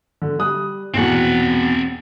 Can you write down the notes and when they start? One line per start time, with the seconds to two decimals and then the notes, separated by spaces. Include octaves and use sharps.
0.22 D3
0.39 G3 D#6 F#6
0.94 A#1 E2 B2 C4 F#5